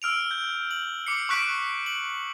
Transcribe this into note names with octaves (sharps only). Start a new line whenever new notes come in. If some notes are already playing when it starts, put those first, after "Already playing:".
E6 F6 D7 F7
G6
F#7
D6 C7 C#7
C#6 D6 F#6 B6 D7 F#7
F#7